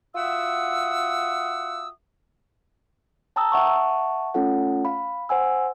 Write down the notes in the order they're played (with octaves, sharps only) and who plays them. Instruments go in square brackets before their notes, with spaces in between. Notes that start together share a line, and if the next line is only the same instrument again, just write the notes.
[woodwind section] F4 F#4 E5 F#5 D#6 E6
[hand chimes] G5 A5 A#5 D#6 E6
E5 F#5 A5 C#6
A3 C#4 F4 A4 F#5
F5 B5
C5 F#5 G#5 E6